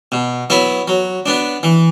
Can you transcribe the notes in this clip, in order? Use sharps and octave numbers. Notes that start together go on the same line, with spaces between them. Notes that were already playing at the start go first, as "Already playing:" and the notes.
B2
F#3 B3 E4
F#3
B3 D4
E3